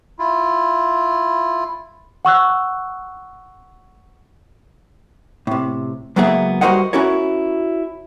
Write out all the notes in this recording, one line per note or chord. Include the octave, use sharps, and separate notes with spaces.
E4 F4
F#5 C#6 E6 F#6
A2 C3
C#2 F#3 A#3 B3 G#4 E5
G3 F#4 A#4 C5 D#5 F#5
C#4 E4 F#4 A#4 C#5